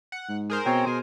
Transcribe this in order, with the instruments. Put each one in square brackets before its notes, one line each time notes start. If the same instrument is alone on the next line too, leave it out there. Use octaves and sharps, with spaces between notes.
[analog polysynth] F#5
[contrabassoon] G#2
[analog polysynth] G#4 A#4 C5
[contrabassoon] B2 [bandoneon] C4 C#5 G5
[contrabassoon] B2 [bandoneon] G#5